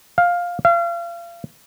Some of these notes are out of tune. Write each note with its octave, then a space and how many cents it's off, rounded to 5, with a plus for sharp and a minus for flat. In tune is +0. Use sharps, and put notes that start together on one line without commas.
F5 +10
F5 -35